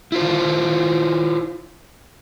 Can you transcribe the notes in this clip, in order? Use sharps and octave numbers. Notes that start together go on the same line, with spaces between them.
E4 F4 C5